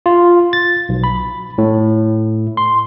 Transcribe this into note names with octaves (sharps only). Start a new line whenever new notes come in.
F4
A6
B1
B5
A2
C6